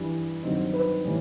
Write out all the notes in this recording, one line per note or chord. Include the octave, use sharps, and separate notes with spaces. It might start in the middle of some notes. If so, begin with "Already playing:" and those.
Already playing: G2 E3 G3
G2 D#3 F#3 C4 D#4
B4
A2 E3 G3